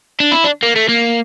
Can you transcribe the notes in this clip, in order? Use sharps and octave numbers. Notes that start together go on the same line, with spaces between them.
D4
E4
D4
A#3
A3
A#3